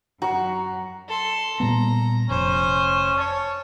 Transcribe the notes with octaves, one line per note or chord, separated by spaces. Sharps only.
F#2 F#4 F#5 A#5
A4 C6
A#2 G3 B3 A#5
F1 C#4 C5
C#5 A5